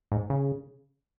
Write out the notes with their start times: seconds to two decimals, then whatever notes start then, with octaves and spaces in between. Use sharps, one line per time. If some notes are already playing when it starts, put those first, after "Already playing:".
0.12 G#2
0.30 C#3